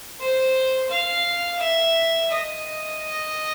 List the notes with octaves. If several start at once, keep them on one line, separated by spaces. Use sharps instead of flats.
C5
F5
E5
D#5